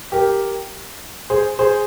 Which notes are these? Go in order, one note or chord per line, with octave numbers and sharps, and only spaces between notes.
G4 A#4
G#4 C5
G#4 C5